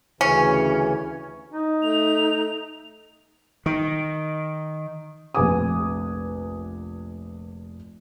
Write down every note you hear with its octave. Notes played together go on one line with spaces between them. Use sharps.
D2 C#3 E3 C#4
D#4
A3 F7
D#3
F1 A#1 B4 G#5 D6 D#6